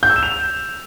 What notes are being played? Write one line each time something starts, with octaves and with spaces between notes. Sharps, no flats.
G6
E6
E7
F7